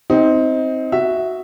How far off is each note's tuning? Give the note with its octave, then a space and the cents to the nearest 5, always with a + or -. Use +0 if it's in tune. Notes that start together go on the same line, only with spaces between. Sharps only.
C4 +0 D#4 +25
F#4 +0 E5 +0